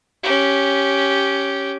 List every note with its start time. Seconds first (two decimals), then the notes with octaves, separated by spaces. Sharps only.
0.23 C#4 G4